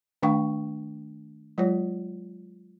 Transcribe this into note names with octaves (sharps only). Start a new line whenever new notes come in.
D#3 A3 D4 F5 G5 C#6
F#3 G#3 F4 C#5